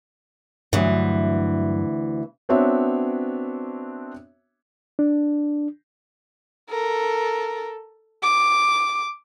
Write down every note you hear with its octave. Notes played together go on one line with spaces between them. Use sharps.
D2 G2 E3 F#3
B3 C4 D4 F#4 C#5 E5
D4
A4 A#4
D6